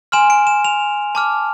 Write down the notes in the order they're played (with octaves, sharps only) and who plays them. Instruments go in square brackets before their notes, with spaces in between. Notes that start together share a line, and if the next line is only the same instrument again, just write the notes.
[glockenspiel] G#5 C6 F6 E7
D7
E7
F7
A5 D6 F6